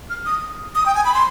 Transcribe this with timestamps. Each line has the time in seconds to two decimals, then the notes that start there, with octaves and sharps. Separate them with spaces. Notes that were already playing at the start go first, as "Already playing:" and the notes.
0.10 F6
0.26 D#6
0.75 D#6
0.86 G5
0.95 G#5
1.05 B5
1.14 C6